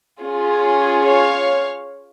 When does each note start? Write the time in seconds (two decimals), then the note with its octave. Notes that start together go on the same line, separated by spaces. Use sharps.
0.20 C#4 F4 G#4
1.05 C#5 F5